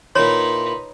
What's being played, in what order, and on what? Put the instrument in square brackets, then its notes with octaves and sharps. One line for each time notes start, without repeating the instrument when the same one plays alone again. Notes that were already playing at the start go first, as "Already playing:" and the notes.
[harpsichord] A#2 E4 [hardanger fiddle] D#4 B4 [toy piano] C#5 [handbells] C6